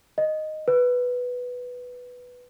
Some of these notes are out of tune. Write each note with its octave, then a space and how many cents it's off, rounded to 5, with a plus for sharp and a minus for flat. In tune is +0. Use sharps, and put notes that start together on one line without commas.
D#5 -5
B4 +0